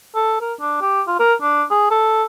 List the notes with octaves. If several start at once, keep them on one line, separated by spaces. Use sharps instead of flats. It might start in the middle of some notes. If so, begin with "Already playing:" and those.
A4
A#4
D4
G4
F4
A#4
D4
G#4
A4